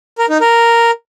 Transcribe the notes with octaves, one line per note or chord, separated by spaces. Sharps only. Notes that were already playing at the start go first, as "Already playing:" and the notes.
A#4
D#4
A#4